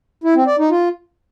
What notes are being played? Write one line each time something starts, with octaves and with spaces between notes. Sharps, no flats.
E4
C4
D5
D#4
F4